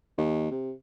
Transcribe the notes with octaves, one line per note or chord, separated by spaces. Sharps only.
D#2
C3